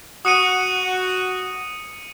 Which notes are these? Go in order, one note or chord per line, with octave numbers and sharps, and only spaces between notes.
F#4 D#6 C#7 D#7